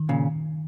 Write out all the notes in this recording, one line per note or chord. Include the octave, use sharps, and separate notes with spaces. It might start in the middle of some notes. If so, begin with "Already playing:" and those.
Already playing: D#3
A#2 C#3